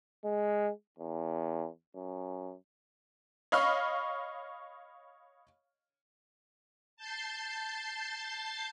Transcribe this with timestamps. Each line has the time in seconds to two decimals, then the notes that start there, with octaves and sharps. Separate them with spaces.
0.25 G#3
0.98 E2
1.96 F#2
3.52 C#5 D#5 F5 B5 C#6 F6
6.97 A5 G6 A6 C7